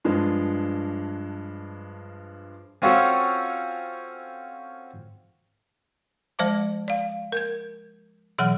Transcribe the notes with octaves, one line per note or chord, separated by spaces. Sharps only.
G2 F3 G#3 D4
C4 C#4 F4 F#4 A4 C#5
F3 G#3 C5 E5 A5 D6
D5 F5
A#4 G6 G#6
B2 E3 F#3 F#5 F6